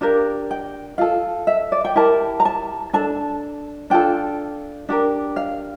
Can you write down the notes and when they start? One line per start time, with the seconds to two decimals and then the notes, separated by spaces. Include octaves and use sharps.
0.01 D4 G4 A#4 F5
0.51 G5
0.98 F4 A4 F5
1.47 E5
1.72 D5
1.85 G5
1.96 E4 G4 A#4 A5
2.40 A#5
2.45 A5
2.93 D4 A4 A5
3.90 D4 F4 A4 G5
4.89 D4 G4 A#4
5.36 F5